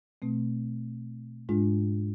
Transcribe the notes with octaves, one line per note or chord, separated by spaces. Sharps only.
B2 A3 C4
G#2 G#3 D4 F4